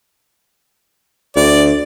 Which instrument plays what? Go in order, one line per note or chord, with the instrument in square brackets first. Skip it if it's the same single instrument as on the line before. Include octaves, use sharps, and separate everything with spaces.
[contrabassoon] D2 [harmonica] D5